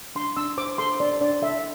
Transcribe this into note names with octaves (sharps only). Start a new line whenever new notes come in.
D4 C6
D4 E6
C5 D6
A4 C6
D4 D5
D4 D5
A4 E5